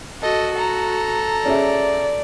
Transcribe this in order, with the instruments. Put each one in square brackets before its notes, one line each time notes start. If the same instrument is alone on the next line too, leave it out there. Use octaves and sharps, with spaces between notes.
[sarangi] F#4 [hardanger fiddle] A4 D#5
[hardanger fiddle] A4 A#5
[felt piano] C#4 G#4 E5 [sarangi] D5